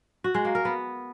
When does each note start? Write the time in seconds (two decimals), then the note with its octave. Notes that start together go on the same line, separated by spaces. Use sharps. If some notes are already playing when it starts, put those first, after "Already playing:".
0.24 F#4
0.35 G#3
0.45 A#3
0.55 A#4
0.65 B3